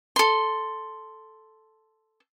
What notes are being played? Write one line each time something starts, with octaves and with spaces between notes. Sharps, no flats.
A4 C6